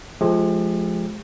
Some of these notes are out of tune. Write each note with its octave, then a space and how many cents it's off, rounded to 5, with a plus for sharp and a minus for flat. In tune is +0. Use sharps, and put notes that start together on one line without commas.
F3 +0 G#3 +35 G4 +40